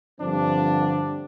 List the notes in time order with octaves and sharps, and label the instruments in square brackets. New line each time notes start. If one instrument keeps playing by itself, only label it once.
[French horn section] G2 D3 F3 C4 [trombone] D4